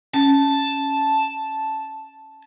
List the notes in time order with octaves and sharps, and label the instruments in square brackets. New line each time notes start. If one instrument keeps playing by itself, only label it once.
[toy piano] C#4 [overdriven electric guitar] A5